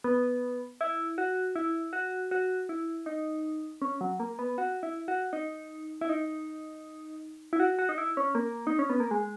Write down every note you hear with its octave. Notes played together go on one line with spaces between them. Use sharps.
B3
E4
F#4
E4
F#4
F#4
E4
D#4
C#4
F#3
A#3
B3
F#4
E4
F#4
D#4
E4
D#4
E4
F#4
F#4
D#4
E4
C#4
A#3
D#4
C#4
B3
A#3
G#3